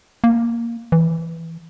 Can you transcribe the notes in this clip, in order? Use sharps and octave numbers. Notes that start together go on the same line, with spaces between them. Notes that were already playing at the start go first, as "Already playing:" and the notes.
A#3
E3